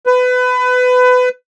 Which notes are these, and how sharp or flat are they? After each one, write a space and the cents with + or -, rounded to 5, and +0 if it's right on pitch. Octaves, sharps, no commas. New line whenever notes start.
B4 +25